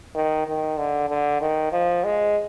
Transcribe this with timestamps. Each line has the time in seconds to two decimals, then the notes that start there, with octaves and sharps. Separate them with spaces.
0.15 D#3
0.47 D#3
0.78 D3
1.09 D3
1.41 D#3
1.72 F3
2.04 G#3